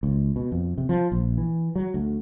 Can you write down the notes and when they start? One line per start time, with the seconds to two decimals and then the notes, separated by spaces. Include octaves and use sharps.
0.03 C#2
0.36 B2
0.52 F2
0.78 C3
0.89 F3
1.12 A#1
1.37 E3
1.76 F#3
1.94 D2